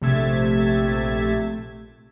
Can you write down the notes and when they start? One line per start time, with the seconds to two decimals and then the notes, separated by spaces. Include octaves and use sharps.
0.01 A#1 C3 A3 E5 G#6 A6